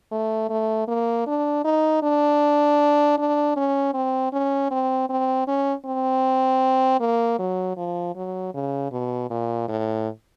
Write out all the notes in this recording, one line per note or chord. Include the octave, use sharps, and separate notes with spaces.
A3
A3
A#3
D4
D#4
D4
D4
C#4
C4
C#4
C4
C4
C#4
C4
A#3
F#3
F3
F#3
C#3
B2
A#2
A2